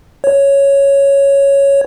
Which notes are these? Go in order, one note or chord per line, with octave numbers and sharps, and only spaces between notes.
C#5